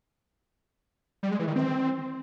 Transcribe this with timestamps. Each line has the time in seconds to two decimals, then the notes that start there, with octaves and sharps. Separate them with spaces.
1.23 G3
1.31 G#3
1.39 E3
1.47 D#3
1.56 C4